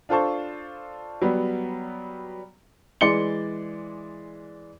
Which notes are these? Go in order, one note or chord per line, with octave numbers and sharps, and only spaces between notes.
D4 F4 A4 C5 A5 C#6
F#3 G3 B3
E3 G#3 D5 C6 C#7 G7